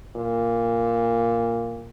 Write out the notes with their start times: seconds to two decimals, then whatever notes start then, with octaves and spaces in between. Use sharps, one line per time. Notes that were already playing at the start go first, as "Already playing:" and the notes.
0.16 A#2